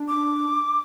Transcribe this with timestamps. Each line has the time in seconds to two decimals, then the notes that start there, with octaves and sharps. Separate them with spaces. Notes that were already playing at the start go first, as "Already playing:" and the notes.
Already playing: D4
0.08 D6